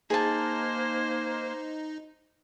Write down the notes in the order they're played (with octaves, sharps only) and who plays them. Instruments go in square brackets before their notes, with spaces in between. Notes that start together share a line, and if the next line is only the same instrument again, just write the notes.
[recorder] A#3 [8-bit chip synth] D#4 [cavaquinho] G#4 A5 [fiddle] C5